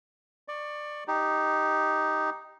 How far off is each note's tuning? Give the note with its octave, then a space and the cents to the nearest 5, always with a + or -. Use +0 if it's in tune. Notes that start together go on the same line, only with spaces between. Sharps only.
D5 +20 C#6 +0
D#4 +0 G4 +0